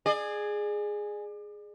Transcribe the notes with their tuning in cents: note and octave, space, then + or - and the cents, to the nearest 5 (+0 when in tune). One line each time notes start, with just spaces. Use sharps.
G#4 +0 D5 +35